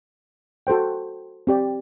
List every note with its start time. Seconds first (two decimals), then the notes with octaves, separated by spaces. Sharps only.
0.67 F#4 A4 C5 G5
1.47 C4 G4 D5